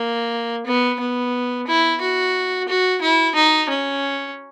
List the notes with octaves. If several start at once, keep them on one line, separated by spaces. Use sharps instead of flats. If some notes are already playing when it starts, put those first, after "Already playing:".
Already playing: A#3
B3
B3
E4
F#4
F#4
E4
D#4
C#4